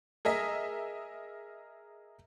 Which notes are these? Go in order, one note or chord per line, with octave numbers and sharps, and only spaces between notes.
G#4 A#4 D#5 E5